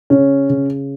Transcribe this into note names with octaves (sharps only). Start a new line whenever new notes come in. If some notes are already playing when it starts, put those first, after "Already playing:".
C#3 C#4
C#3